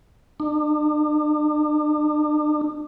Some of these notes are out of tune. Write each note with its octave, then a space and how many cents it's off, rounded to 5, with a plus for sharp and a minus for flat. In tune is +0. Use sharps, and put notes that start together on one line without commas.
D4 +40